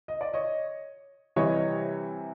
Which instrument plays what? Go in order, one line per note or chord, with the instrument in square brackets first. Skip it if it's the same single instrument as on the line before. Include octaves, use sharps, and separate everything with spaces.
[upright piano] D#5
D5
C#5 D#5
C3 E3 G3 C#5 D#5